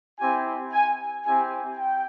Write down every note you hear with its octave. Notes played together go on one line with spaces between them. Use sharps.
C4 E4 G4 G#5
G#5
C4 E4 G4 G#5
G5